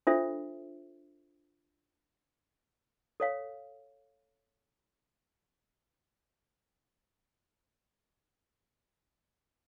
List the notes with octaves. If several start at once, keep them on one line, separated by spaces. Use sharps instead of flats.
D4 F4 A4 C5 E5
A4 C#5 F5